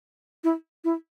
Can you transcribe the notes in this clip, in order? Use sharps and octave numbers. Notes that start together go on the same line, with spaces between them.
E4
E4